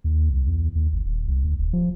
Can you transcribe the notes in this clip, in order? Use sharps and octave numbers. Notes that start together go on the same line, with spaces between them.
D#2
C2
E2
D#2
G1
D#1
C2
D2
D#1
F3